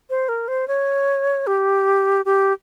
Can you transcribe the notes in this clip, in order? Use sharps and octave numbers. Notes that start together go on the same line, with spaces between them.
C5
A#4
C5
C#5
G4
G4